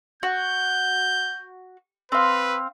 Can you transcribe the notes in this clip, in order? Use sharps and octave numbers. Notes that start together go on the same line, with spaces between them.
F#4 G6
C4 B4 F5